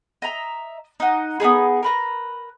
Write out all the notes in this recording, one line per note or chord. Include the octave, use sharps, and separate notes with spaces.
D#5 E5 A#5
D#4 F#5
B3 C4 D#4 G#4
A#4 B4 A#5